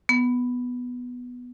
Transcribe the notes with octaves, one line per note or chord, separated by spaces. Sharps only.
B3